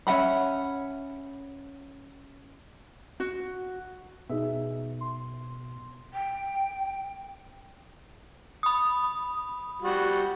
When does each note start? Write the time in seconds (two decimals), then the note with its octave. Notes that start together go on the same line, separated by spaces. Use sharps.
0.07 C#4 E5 F#5 B5
3.20 F#4
4.30 B2 D#4 G#4 E5
5.01 C6
6.13 G5
8.63 B5 D#6
9.82 G3 F#4